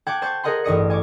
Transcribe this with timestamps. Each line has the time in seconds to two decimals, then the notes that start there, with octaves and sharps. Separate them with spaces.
0.07 F#5 G5 A5 D6 G#6
0.22 C5 A5 C#6 G6
0.43 G#4 A#4 D#5 F#5 C6
0.64 A1 G2 D#5 C#7
0.90 G#5 C#6 D6